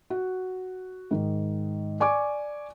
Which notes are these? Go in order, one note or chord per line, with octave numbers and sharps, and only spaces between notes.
F#4
G#2 D#3
D5 G#5 C#6 D6